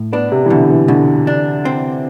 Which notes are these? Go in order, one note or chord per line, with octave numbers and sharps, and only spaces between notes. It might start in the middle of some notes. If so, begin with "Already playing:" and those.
Already playing: A2
B3 D4
C3
E3
B2 D3
E3
B2 D3
D4
C4